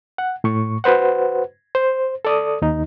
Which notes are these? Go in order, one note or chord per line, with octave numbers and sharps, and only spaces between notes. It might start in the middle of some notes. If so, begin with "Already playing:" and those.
F#5
A2 C#6
F#4 B4 C5 F#5
C5
A4 D5 D#6
D#2 D#4